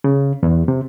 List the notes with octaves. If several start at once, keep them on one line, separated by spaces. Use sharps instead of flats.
C#3
E2
C3